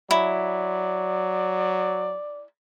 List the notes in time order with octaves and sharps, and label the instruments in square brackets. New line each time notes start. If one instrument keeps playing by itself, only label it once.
[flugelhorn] F#3 [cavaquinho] E4 [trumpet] D5